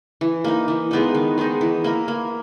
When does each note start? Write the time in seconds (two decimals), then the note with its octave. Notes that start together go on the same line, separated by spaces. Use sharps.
0.21 E3
0.45 A#3 D#4
0.68 E3
0.91 G#3 B3 D#4
1.15 D#3
1.38 G#3 B3 D#4
1.61 E3
1.84 A#3 E4 A#4
2.08 A#3